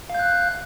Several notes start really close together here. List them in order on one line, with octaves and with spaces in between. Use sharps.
F5 G6 F#6